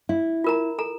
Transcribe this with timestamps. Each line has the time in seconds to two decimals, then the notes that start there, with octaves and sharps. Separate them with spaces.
0.09 E4
0.44 F4 A#4 A#5
0.79 A4 A#5